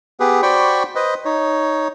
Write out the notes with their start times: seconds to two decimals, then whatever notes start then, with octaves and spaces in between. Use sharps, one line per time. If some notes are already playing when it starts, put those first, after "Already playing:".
0.20 B3 G4 G#4 B4
0.42 F#4 C5 D5 G5 B5 C#6
0.95 B4 C5 D#5
1.25 D#4 C#5